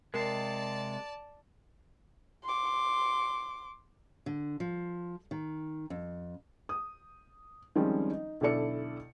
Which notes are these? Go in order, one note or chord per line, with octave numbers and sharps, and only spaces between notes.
C3 G#3 A#4 D5 A5 C7
C6 D6
D3
F3
D#3
F2
D#6
D#3 F3 G3 G#3 C4 C#4
D#4
B1 D3 E4 A4 D5 C#7